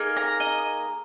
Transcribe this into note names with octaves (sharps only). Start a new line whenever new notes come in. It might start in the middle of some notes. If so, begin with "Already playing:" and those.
Already playing: A#3 D#4 G#4
A#5
D#5